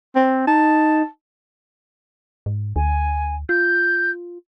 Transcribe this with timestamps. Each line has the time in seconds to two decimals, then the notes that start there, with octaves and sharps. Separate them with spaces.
0.16 C4
0.47 D#4 A5
2.46 G#2
2.76 D2 G#5
3.49 F4 G6